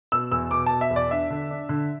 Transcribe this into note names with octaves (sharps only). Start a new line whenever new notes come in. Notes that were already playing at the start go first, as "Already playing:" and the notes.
B2 E6
E2 E6
B2 D6
B2 A5
E5
E2
D5
D4 E5
D3
D4
D3